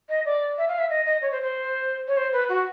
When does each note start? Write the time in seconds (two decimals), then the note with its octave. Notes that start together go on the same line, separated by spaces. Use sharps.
0.09 D#5
0.25 D5
0.58 E5
0.68 F5
0.79 E5
0.90 D#5
1.06 D#5
1.22 C#5
1.31 C5
1.42 C5
2.08 C#5
2.17 C5
2.33 B4
2.49 F#4